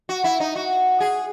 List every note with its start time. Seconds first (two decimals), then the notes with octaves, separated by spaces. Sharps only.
0.09 F#4
0.24 E4
0.40 D#4
0.56 F#4
1.00 G#4